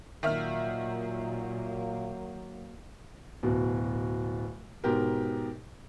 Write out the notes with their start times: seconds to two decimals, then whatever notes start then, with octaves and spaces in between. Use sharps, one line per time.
0.23 A#2 D#3 F#3 A#3 E5 F6
3.43 D1 B2
4.84 G#2 B2 G4 A#4